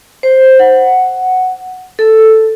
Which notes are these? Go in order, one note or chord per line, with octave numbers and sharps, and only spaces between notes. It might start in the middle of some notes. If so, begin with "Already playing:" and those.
C5
F#5
A4